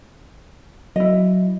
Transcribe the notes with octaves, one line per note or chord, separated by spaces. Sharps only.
F#3 E4 D#5